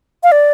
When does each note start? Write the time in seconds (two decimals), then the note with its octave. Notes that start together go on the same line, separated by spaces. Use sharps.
0.23 F5
0.32 D5